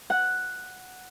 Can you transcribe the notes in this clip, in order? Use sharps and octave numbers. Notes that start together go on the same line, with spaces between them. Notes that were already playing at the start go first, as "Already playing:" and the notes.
F#5